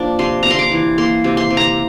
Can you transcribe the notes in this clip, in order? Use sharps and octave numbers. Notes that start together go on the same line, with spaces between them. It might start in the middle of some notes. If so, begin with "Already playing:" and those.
Already playing: F3 A#3 D4
C3 C6
C3 A#5
C6
D6
E3
A#3 C6
C3
C6
C3
A#5